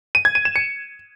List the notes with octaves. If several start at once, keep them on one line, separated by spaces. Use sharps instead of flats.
D#7
G#6
D#7
E7
C#7